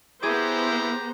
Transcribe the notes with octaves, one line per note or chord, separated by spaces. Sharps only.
B3 E4 G4 G#4 C5 A#5 D6